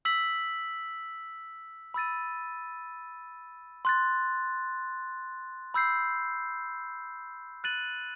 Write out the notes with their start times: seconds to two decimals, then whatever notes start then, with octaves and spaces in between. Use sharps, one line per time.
0.05 E6 B6 F#7
1.94 B5 E6 A6 D#7
3.85 C6 F#6 A6
5.74 B5 E6 G6 C7
7.64 F#6 A6 D#7 F#7